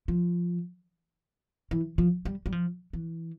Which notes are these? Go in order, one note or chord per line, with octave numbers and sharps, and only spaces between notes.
F3
E3
F3
G3
G3
F3
E3